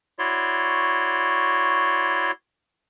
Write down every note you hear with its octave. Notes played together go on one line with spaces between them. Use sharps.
E4 F#4 C#5 D5 C6